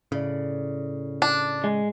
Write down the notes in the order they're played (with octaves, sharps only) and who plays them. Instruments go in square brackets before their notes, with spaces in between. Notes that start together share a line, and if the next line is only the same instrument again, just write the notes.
[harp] A2 D5 [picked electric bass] C#3
[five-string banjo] D4
[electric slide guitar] G#3